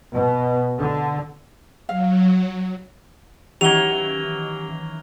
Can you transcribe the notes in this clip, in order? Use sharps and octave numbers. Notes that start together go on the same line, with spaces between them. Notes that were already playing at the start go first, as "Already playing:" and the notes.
B2
D3
F#3 F5
D#3 E3 F#3 A#3 C#4 G4 F7 G7